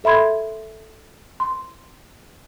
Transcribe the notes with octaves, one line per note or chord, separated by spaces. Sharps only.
A4 E5 B5 C6 G#6
C6